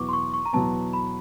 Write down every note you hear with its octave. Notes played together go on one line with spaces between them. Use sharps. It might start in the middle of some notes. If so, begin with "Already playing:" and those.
Already playing: E2 B2 F#3 B3 C#6 D6
C6
C#6
C#6
A#5
E2 B2 F#3 B3 A5
B5